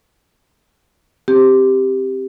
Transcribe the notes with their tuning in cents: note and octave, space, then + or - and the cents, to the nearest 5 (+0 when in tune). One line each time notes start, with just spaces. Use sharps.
C4 +5 G4 +0